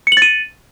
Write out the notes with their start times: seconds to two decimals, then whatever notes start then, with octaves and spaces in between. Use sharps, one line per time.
0.07 C#7
0.12 F#7
0.17 A6
0.22 D#7